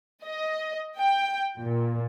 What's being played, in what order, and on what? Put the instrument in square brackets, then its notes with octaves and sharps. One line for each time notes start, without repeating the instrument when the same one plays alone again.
[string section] D#5
G5
A#2